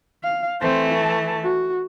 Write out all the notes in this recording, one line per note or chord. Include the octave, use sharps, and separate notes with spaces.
F5
E3 A3 C4 C5
A5
F#4